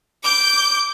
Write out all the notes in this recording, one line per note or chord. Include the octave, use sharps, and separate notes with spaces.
D6 G6